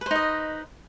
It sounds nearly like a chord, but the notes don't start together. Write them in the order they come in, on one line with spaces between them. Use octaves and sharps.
B4 C5 D#4 D#5